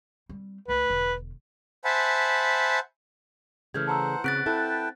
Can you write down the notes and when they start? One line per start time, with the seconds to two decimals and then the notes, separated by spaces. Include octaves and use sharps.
0.29 G3 C4
0.68 C#2 A3 B4
0.90 E1 D3
1.85 C5 E5 F#5 G#5 A5 B5
3.74 C#3 E3 A3 F6 G6 G#6
3.87 C5 F#5 A5 A#5 E6
4.24 C#3 B3 C4 F#4 F#6 A6 B6 D7
4.46 E4 A4 B4 G5 A5